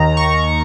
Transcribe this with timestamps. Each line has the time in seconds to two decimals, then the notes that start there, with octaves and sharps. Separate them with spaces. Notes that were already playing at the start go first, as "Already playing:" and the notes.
Already playing: D#2 D#3 A#5
0.17 C#6